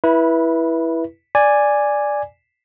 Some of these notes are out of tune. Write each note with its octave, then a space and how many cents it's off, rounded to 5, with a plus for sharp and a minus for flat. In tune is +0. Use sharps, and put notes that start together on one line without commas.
E4 +0 B4 -20
D5 +0 G#5 -5